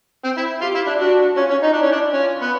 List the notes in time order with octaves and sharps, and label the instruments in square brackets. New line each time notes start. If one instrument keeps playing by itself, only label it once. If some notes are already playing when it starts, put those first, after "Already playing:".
[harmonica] C4
E4
[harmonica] F4 [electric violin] G4
[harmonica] E4
D4
[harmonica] D4 [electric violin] F#4
[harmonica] C#4 [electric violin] F4
[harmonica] C#4
D#4
[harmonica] D4 [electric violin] E4
[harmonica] C#4
D4
[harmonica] C#4 [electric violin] F4
[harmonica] B3